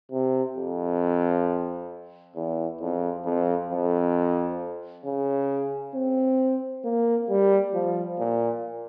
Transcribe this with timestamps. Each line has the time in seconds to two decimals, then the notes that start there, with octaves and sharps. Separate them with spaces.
0.12 C3
0.56 F2
2.36 E2
2.81 F2
3.25 F2
3.70 F2
5.05 C#3
5.95 C4
6.85 A#3
7.30 G3
7.74 F3
8.19 A#2